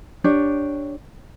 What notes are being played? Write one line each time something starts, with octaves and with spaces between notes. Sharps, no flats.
D4 G4 C#5